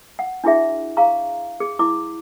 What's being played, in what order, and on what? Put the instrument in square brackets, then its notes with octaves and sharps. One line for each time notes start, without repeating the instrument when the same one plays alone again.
[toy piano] F#5
D4 E4 F#4 G#4 E5
G#4 F5 A#5 C#6
G#4
E4 D6